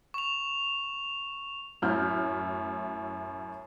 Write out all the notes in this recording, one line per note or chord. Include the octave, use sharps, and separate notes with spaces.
C#6 F7
F#2 A2 E4 F6 G6